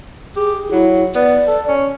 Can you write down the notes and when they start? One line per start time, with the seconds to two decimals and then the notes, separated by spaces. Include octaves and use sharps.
0.36 G4 G#4
0.72 F#3 E4
1.15 B3 D5
1.47 A4
1.68 C#4